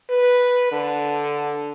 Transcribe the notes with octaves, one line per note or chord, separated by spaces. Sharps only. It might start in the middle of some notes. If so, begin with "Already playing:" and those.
B4
D3